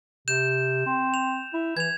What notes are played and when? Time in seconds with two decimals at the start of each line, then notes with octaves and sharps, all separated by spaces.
0.28 C3 G6 E7
0.87 C4
1.14 F7
1.54 E4
1.77 E3 G#6 F7